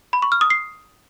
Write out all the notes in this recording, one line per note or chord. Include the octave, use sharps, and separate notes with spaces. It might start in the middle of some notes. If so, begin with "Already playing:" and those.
B5
C#6
F6
D#6
C7